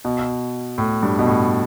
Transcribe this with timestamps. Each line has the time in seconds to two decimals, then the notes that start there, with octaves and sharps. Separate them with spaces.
0.05 B2
0.78 A2
1.03 G2
1.19 B2
1.27 A2